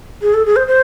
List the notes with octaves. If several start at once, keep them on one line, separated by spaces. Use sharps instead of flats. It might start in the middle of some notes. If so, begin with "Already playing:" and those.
G#4
A4
G#4
C5
C5